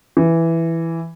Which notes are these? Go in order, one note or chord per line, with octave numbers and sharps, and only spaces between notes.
E3